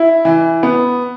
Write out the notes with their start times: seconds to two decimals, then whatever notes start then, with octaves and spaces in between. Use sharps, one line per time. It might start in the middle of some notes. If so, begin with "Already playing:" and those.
Already playing: E4
0.25 E3
0.63 B3